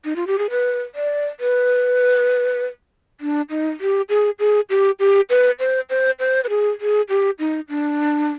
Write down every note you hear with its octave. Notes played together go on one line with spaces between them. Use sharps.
D#4
F4
G4
G#4
B4
D5
B4
D4
D#4
G4
G#4
G#4
G4
G4
B4
C5
C5
C5
B4
G#4
G#4
G4
D#4
D4